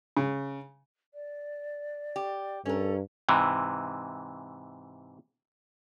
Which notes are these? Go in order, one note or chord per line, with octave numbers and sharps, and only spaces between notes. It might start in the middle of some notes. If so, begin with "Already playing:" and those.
C#3
D5
G4
G2 C#4 A4 A#4
G#2 C3 E3